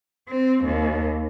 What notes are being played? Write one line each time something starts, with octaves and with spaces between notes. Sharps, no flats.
C4
D#2